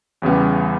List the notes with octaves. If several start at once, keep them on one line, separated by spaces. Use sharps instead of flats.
E2 C#3 G3 B3